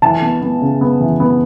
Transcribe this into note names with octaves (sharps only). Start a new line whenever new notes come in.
E3 A5
B3
B3
C#3
B3
E3
B3